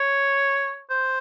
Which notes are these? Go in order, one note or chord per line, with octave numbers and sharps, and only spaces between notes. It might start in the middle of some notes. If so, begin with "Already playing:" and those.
Already playing: C#5
C5